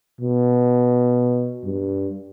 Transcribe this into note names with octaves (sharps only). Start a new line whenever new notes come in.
B2
G2